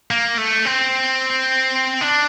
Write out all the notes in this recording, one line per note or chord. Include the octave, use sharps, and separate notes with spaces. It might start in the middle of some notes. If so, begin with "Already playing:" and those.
A#3
A3
C4
D4